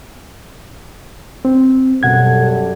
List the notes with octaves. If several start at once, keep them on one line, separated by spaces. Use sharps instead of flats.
C4
F#2 B2 G3 A4 F#5 G#6